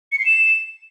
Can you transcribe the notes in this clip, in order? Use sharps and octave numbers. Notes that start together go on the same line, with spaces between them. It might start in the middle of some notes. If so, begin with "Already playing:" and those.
C#7
C7
E7